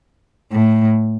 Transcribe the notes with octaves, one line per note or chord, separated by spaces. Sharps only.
A2